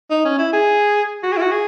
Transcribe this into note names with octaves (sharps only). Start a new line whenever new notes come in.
D#4
C#4
E4
G#4
F#4
G#4
E4
F#4
G#4